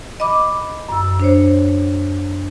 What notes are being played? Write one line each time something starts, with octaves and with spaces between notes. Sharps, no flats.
D#5 B5 D6
F#2 E6
D4 C5 C#5